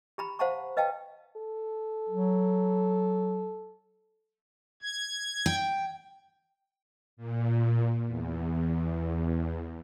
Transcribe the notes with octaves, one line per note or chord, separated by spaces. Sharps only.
G4 A#5 B5
C5 F5 F#5 A5 A#5 C#6
B4 D#5 F5 G5 A5
A4
F#3
G#6
G5
A#2
E2